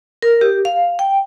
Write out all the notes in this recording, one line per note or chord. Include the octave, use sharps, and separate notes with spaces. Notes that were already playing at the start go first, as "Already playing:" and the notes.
A#4
G4
F5
G5